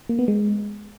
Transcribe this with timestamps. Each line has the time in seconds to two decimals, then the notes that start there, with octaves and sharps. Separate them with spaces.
0.09 A#3
0.19 B3
0.28 G#3